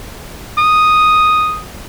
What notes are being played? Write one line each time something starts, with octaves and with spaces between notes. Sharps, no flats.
D#6